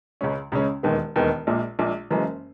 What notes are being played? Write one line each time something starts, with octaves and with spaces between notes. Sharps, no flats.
C#2 C#3 G#3 C#4
C#2 C#3 G#3 C#4
E1 D#2 D#3 G#3 B3
E1 D#2 D#3 G#3 B3
A#1 A#2 G#3
A#1 A#2 G#3
F#1 F#2 E3 G#3